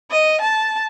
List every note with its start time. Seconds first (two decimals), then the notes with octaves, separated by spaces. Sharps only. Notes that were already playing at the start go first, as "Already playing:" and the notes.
0.11 D#5
0.40 A5